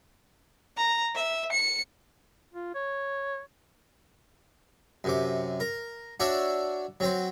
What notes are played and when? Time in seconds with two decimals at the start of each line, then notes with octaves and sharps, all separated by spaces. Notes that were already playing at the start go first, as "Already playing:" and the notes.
0.77 A#5
1.15 E5
1.52 C#7
2.53 F4
2.75 C#5
5.04 F#2 C3 D6
5.60 A#4
6.20 D4 F#4 C#5 D5 E5
7.00 F#3 C4 C5